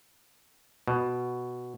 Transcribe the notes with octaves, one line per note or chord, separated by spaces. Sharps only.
B2